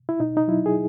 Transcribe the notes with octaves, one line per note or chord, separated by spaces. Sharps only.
E4
B2 D#4
D#4
F#3 E4
G#4